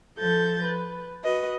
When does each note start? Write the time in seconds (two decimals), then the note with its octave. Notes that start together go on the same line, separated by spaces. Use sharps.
0.17 F3 A4 G6 A6
0.63 B4
1.24 F#4 B4 D#5